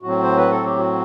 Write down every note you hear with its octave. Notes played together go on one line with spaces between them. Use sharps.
A2 F#3 C4 F#4
C5
B4
A4
G4
F#4